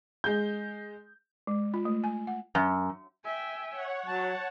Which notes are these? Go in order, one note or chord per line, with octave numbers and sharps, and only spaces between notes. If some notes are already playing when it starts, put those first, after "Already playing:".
G#3 G6
G#3
F4
A3
G#5
F#5
F#2
E5 G5 G#5
C#5 F#5
F#3 A5